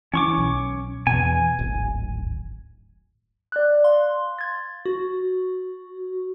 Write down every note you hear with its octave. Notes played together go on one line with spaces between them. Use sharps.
E3 C#4 C#6 D6
B1
E2 B2 G#5
D1 G#1
D5 F#6
F5 C6
G#6 A6
F#4